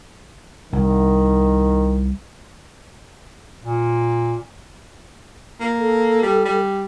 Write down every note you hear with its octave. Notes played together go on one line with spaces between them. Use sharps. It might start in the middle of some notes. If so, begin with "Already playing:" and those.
C2 D#3
A#2
A#3
A4
G3
G3